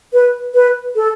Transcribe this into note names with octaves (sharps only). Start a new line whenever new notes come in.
B4
B4
A4